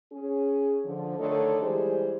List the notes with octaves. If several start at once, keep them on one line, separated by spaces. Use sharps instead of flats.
C#4 G#4
D3 F3
D3 D#3 A3 D#4 A4 C#5
E3 G3 G#3 G4 G#4 C5